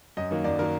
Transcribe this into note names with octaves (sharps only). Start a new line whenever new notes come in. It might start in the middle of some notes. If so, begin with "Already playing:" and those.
F#2 D#5
D#3 F#3 A#3
F#2 D5
D#3 F#3 A#3 A#4